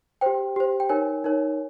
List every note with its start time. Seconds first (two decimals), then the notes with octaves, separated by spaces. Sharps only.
0.21 G4 C5 G5
0.56 G4 C5
0.80 G5
0.89 D#4 A#4 C#5 G#5
1.24 D#4 A#4 C#5